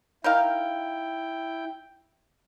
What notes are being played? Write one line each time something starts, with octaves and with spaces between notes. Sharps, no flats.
D#4 E4 A#4 F5 G5